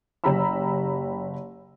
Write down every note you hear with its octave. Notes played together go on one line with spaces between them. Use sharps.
F#1 G4 A#5 B5 E6